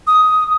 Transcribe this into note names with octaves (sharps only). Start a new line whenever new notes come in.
D#6